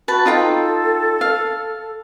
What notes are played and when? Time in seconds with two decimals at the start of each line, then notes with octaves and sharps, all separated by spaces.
0.08 F#4 B4 A5
0.26 D#4 F4 A4 G5
1.21 F5